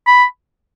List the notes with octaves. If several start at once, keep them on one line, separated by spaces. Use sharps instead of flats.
B5